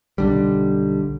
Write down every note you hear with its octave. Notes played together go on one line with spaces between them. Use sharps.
B1 D3 G3